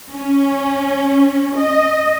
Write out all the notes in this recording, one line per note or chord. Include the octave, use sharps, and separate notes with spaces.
C#4
D#5